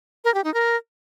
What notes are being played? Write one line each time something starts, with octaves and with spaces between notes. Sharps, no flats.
A#4
G4
D#4
A#4